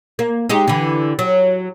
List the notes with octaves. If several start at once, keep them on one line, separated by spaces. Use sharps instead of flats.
A#3
G#3 D#4 G4
D3 E3
F#3